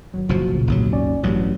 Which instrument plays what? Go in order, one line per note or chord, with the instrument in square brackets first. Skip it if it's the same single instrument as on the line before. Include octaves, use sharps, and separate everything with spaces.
[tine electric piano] G#1 F#3
[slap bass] F#1 B2 F3 [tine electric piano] F#4
[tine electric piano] C2 A#2 C#3
[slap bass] G#1 D#2 F#3
[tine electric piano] C#4 D5
[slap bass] A1 G2 [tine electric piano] F#3